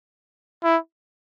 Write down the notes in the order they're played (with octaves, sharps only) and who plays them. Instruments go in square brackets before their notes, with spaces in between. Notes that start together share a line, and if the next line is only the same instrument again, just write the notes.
[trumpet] E4